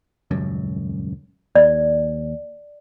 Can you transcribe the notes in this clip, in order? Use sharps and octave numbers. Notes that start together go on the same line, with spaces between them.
D#1 C#2 F#2
D#2 D5